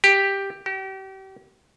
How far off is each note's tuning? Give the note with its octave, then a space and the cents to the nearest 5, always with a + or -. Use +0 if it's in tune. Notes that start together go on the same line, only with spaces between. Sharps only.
G4 +5
G4 -35